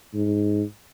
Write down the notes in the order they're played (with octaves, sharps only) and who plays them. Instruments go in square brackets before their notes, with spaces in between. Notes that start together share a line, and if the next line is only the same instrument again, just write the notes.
[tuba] G#2